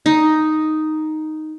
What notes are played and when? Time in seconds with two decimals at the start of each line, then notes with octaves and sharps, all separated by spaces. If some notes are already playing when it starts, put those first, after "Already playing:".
0.06 D#4